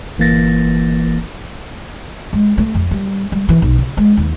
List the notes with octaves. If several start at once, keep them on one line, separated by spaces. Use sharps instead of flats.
G1 E3 A#3 A6 A#6
G#3
A3
F2
G3
G3
E3
B1
C#3
G#3
D#2